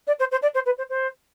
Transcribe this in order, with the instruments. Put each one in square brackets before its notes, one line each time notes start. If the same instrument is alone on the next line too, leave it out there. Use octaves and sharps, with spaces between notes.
[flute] D5
C5
C5
D5
C5
B4
C5
C5